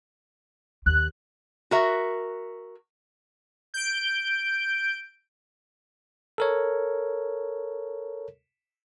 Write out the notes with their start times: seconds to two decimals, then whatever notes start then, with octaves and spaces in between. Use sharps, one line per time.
0.86 D#2 F#6
1.71 F#4 A#4 E5
3.74 G6 D7
6.38 A4 A#4 C#5